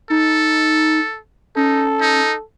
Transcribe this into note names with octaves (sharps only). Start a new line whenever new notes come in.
D#4 A4
C#4 D#4 A4
D#4